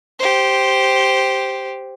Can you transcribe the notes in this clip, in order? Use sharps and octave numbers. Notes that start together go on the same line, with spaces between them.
G4 C5